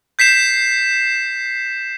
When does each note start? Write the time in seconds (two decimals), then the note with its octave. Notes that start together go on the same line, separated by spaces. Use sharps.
0.19 G6 B6 C7 E7